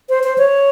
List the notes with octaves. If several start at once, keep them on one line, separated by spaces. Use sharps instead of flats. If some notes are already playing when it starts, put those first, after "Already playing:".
C5
C5
C#5